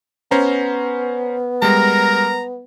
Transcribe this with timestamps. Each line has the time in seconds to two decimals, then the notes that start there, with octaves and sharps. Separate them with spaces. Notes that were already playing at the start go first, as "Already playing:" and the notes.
0.31 B3 C#4 C5 A#5
1.62 G3 G#3 A#4 A#5